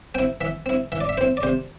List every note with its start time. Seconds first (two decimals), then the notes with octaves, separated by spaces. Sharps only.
0.15 C4 E4 G5
0.41 E3 E5
0.66 C4 E4
0.92 E3 E5
1.01 D5
1.09 E5
1.18 C4 E4 C5
1.37 D5
1.43 C3 C5